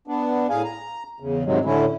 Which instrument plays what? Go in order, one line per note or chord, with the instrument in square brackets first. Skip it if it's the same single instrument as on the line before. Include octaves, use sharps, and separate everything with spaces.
[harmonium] B3 D4
A2 G#4 F5 G#5
A#5
E2 C#3
G#2 C3 D#3 F#3 G#3
A2 D3 C#4 E4